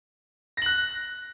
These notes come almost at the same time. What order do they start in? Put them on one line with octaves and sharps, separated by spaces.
A#6 F#7 F#6